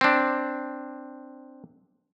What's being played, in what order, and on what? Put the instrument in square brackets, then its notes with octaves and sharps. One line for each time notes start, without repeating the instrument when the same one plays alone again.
[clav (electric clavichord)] C4 D4